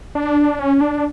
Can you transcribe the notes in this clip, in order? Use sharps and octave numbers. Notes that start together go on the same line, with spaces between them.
D4
C#4
D4